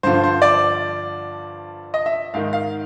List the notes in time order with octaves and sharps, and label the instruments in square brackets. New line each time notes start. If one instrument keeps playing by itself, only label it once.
[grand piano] G2 D3 F3 C5
C5
D5
D#5
E5
G#2 D#3 F5
F5